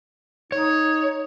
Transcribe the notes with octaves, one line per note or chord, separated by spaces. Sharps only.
D#4 C#5